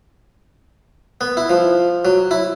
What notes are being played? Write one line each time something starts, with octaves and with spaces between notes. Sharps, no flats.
B3
E4
F3
F#3
E4